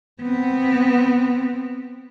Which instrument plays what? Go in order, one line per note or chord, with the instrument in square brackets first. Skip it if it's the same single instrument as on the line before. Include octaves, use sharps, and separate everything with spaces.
[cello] B3 C4